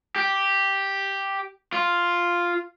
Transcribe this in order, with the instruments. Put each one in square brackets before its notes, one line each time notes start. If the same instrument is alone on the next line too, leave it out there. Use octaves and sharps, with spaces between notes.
[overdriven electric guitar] G4
F4